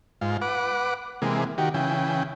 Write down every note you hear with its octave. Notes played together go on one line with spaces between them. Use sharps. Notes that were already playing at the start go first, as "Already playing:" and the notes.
G#2 F4
B4 F#5 D6
C3 E3 G#3 A#3
D#3 F#4 G4
C#3 E3 G5